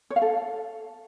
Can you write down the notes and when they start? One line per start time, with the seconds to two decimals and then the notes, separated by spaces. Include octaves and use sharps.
0.10 C#5
0.16 F5
0.22 A4